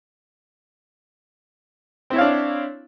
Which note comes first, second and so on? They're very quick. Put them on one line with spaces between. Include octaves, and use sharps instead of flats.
C4 E4 C#5 F5 D4